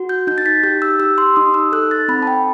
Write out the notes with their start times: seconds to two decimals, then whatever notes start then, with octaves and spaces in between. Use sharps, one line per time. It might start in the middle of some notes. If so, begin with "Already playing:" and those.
Already playing: F#4
0.09 G6
0.27 D#4 G6
0.38 A6
0.46 B6
0.63 G4 G6
0.82 E6
1.00 G4 E6
1.18 C6
1.36 D#4 D#6
1.54 E6
1.72 A4 F#6
1.91 A6
2.08 C4 B5
2.22 A5
2.27 G5